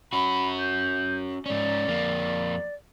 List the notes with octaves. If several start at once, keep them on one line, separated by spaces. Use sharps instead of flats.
C#4 F#4 B5
G6
G#2 C#4 D5
F2 A#3